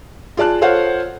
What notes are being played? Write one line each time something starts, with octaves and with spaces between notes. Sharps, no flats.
F4 G#4 D5 A5 F#6
F4 A4 C5 C#5 F5 F#5